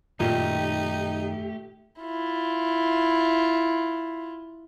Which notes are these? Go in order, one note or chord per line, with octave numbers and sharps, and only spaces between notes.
F#2 A#2 D#3 A3 D#4 G4
E4 F4